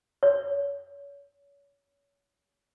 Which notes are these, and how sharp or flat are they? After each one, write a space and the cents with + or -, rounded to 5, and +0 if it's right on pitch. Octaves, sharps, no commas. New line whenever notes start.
C#5 +30